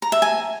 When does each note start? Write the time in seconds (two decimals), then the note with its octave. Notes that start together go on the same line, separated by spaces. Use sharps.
0.02 A#5
0.12 E5
0.22 G#5